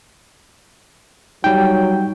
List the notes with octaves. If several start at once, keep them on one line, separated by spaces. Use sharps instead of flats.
F#3 G3 D#4 G5